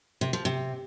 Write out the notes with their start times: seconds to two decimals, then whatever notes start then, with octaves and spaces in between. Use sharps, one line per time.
0.21 C3
0.33 F3
0.45 C3